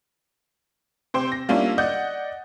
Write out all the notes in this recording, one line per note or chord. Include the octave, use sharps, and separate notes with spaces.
C3 C5 G5
A#6
G3 A#3 C#4 D4 E4 F4
D5 D#5 F#5 G6